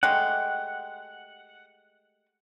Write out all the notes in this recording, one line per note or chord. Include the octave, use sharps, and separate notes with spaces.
G#3 A3 G4 F#5